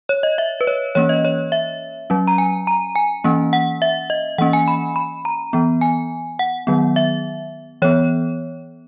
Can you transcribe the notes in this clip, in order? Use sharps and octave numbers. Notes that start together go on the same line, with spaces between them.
C#5
D#5
E5
B4
C#5
E3 A#3 C#4 C#5
D#5
C#5
E5
F#3 C#4
A#5
G#5
A#5
G#5
E3 A#3 C#4
F#5
E5
D#5
E3 A#3 C#4 F#5
G#5
B5
B5
A#5
E3 B3
G#5
F#5
D#3 F#3 B3
E5
E3 B3 C#5